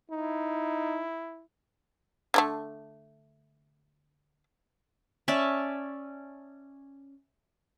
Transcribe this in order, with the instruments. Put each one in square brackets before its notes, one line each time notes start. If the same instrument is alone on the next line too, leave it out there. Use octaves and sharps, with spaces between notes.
[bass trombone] D#4 [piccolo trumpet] E4
[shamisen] D3 G#3 A3
[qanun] C#4 D5 E5 A5